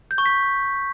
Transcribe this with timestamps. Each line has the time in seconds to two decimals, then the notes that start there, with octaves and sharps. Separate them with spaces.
0.11 G6
0.18 C#6
0.26 B6